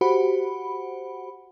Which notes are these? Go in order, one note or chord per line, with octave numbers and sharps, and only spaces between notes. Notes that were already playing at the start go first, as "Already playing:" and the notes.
F#4 G4 C5 F#5 B5